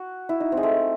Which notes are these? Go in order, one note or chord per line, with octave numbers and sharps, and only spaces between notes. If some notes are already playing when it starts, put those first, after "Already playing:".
Already playing: F#4
E4
D#4
C4
G#3
A3